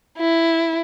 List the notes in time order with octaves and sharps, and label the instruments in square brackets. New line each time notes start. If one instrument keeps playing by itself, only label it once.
[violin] E4